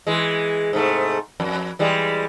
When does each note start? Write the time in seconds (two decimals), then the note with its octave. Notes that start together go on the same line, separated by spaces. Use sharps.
0.07 E3 G#3
0.73 G#2 C3 A3
1.40 F2
1.79 E3 G3 G#3